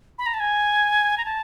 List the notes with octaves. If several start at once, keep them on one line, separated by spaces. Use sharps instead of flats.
B5
A#5
A5
G#5
A#5
A5